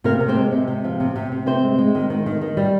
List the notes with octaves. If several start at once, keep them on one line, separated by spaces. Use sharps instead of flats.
C3 A#3 A#4
C3
C4 C5
G#3
C3
C3
F3
C3
C3
C3
C3 C4 C5
G#3
G#3
D#3
D#3
D#3
D#3
G3